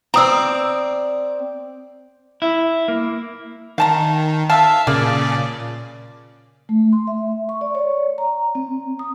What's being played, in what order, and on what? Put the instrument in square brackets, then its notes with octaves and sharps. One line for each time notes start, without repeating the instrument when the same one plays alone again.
[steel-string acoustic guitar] C4 D5 [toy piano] A#5 D#6 E6
[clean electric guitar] E4
A#3
[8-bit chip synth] D#3 [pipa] F5 A5 A#5
[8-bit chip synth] E5 F5 [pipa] A5
[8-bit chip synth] A#2 C#3 D5 [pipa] A#3
[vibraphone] A3
C6
E5
C#6
D5
C#5
A#5
C4
D#6